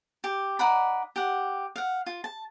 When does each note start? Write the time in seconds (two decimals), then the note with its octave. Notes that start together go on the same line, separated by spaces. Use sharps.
0.24 G4
0.59 D#4 D5 F#5 B5
1.16 G4 F#5
1.76 F5 F#5
2.06 F4
2.24 A5